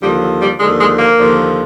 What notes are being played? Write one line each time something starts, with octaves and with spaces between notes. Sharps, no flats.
D#2 D3 F3 G3
F#3
G3
D#2 D3 F3 G#3
G#3
A#3
D#2 D3 F3